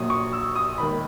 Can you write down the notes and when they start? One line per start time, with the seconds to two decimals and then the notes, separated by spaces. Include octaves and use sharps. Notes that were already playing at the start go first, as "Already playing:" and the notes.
Already playing: A#1 A#2 F#3 D#6
0.10 C#6
0.33 E6
0.55 D#6
0.78 E1 D#2 D#3 B5